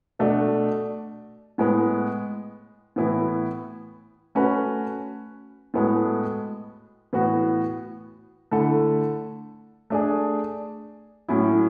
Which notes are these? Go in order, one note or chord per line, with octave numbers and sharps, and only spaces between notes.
B2 A3 D4 A4
A2 G#3 B3
A2 E3 B3 E4
A3 C#4 F#4 B4
A2 G#3 B3 F#4 A4
A2 E3 B3 F#4
D3 A3 E4 A4
A3 D4 G#4
A2 F#3 C#4 E4